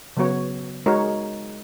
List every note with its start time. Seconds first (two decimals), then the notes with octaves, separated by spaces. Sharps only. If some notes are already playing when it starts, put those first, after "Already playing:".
0.17 C#3 F#3 B3 F#4 C#5
0.86 G#3 D#4 F#4 A#4 C#5